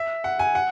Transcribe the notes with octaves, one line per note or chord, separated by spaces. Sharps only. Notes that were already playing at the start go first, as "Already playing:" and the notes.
Already playing: E5
F#5
G#5
F#5